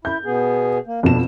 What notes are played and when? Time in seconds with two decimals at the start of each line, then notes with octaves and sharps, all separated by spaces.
0.05 E4 G6
0.25 B2 B3 G#4
0.87 A#3
1.03 F2 B2 D4 E7